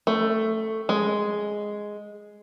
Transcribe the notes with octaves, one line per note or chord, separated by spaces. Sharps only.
A3
G#3